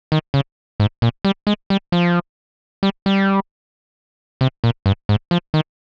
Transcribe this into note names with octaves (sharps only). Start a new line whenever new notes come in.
D#3
C#3
G#2
A#2
G3
G#3
G3
F3
G3
G3
C3
A#2
G2
G#2
F3
D#3